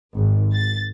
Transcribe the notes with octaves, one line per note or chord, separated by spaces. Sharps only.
G#1
A6